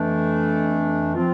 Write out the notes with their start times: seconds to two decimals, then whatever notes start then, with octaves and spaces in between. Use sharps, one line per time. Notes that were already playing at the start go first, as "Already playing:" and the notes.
Already playing: F2 E3 A3 D4
1.14 F3 C4 F4